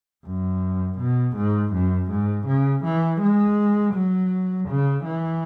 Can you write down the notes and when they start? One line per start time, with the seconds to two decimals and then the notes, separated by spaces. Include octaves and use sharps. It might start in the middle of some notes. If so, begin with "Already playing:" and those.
0.26 F#2
0.99 B2
1.36 G#2
1.73 F#2
2.11 G#2
2.46 C#3
2.84 E3
3.21 G#3
3.94 F#3
4.69 C#3
5.04 E3